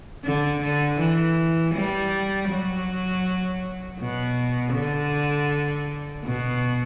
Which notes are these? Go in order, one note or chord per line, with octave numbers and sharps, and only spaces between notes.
D3
D3
E3
G3
F#3
B2
D3
B2